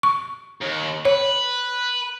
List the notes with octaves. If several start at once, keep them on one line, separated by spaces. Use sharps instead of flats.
C#6
D#2
B4 C#5